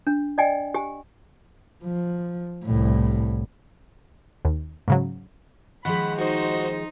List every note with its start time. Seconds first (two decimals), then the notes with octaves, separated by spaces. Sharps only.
0.07 D4
0.38 D5 D#5 G5 G#5
0.74 G4 G#5
1.84 F3
2.64 C2 A2
4.45 D#2
4.88 G#2 C#3 F#3
5.85 D#3 F3 G#3 F#5 B5
6.19 D#4 F#4 C5 D#5